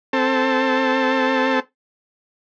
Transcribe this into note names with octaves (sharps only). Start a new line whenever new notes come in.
C4 A4